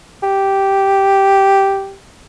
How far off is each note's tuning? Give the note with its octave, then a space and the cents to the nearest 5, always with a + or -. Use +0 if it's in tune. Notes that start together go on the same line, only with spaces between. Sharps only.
G4 -5